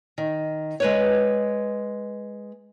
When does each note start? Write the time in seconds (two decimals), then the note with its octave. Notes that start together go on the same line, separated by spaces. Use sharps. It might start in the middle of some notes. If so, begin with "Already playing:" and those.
0.18 D#3
0.80 G#3 B4 C#5